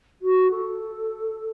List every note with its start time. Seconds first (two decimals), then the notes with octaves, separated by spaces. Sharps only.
0.21 F#4
0.51 A4